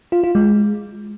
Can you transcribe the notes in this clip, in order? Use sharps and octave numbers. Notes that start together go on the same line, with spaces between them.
F4
F4
G#3